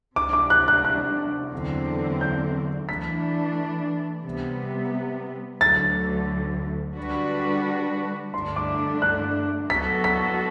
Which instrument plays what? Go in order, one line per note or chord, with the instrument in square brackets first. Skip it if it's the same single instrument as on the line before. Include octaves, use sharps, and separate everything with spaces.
[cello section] C3 G3 D4 [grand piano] D6
[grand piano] D6
F#6
F#6
F#6
[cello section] E2 D3 F#3 C4
[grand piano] G6
[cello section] E3 A3 D4 [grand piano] B6
[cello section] C3 G3 B3
[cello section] D2 D3 F#3 A3 [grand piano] A6
[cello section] D3 G3 D4 F#4 B4
[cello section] G2 D3 A3 D4 [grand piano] C6
[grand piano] D6
F#6
[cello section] F#3 B3 F#4 A4 [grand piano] B6
[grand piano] B6